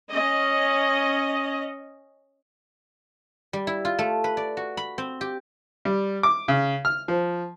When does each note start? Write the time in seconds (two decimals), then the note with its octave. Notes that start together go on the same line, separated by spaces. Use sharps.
0.11 C#4 D#5
3.53 G3
3.67 E4
3.85 F4
3.99 A3
4.24 B4
4.37 D5
4.57 F#4
4.77 B5
4.98 C4
5.21 G4
5.85 G3
6.23 D6
6.48 C#3
6.85 F6
7.08 F3